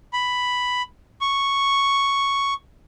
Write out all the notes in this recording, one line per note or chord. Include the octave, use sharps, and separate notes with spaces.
B5
C#6